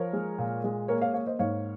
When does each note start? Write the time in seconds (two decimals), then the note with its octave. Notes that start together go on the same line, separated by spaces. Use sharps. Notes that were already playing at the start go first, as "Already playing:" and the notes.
Already playing: F3 A#4 C#5
0.13 G#3
0.38 A#2
0.64 G#3
0.88 A#3 A#4 C#5
1.02 C#5 F5
1.14 A#3 C#5 F5
1.27 C5 D#5
1.39 G#2 C#5 F5